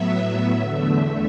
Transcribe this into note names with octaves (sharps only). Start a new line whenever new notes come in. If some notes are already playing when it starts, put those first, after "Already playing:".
Already playing: A2 F#3 B3 E5
E2 D3 A3